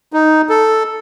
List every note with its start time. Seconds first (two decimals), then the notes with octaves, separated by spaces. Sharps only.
0.13 D#4
0.50 A4